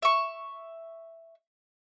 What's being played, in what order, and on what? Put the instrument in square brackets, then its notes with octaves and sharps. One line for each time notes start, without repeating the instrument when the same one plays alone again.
[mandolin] E5 C#6